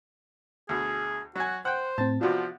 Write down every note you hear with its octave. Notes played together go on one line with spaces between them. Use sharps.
D2 B2 G#4
F#3 F#4 G#5
C5 F#5 G5
A2 C4 A5
C3 F3 B3 D4 F4 F#4